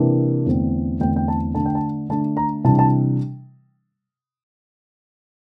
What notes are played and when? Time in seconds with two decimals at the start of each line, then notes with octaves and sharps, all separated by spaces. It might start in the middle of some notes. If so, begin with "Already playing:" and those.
Already playing: C3 E3 A#3 D4
0.46 E2 D3 A3 C4
1.00 E2 D3 A3 C4 G5
1.16 G5
1.28 A5
1.55 D3 A3 D4 A5
1.66 G5
1.75 A5
2.09 D3 A3 D4 A5
2.37 A#5
2.64 C3 E3 G3 D4 A5
2.79 A5